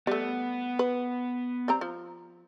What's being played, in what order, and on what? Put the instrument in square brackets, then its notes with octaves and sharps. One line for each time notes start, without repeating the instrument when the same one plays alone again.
[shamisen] G3 A3 [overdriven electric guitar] B3
[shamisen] B4
G3 C4 A#5
F3